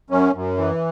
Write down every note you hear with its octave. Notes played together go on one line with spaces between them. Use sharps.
F#2 C#4
F#2
E3